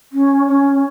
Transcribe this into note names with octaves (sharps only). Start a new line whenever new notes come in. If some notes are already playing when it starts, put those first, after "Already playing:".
C#4
C#4